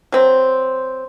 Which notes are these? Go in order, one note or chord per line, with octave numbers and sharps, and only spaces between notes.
F#3 C4